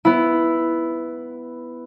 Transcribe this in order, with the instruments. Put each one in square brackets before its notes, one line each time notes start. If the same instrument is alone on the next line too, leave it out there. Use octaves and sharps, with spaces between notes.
[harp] B3 E4